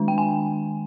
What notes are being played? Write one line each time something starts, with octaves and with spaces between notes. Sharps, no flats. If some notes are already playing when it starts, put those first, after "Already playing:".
Already playing: D#3 G#3 D4
G5
G#5